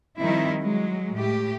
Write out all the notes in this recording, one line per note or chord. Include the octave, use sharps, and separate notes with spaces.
D#3 F3 G3 C4 D#4 E4
F#3 G#3
A2 G4